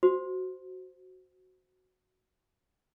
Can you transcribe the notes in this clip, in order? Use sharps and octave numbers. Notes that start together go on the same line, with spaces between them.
F#4 C5